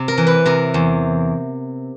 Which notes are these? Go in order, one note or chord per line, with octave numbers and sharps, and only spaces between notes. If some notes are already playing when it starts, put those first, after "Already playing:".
Already playing: C3
A#4
E3
B4
C3 A#4
E2